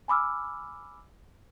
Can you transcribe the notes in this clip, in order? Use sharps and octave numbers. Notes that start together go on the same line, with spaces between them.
G#5 B5 D6 E6 F6